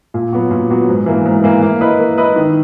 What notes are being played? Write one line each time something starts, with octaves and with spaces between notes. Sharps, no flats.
A#2
F#3 B3 F#4
A#2
F#3 B3 F#4
G#2
E3 A#3
G#2
E3 A#3
A#3
E4 B4 D#5
A#3
E4 B4 D#5
D#3